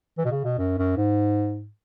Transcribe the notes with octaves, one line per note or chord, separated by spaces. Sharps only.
E3
B2
C#3
B2
F#2
F#2
G#2